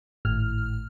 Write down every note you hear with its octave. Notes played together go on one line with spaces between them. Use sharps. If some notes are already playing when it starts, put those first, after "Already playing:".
G#1 A2 F6